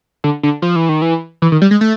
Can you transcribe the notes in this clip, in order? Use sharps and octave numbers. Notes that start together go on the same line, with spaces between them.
D3
D3
F3
E3
D#3
E3
E3
D#3
G3
G#3
A3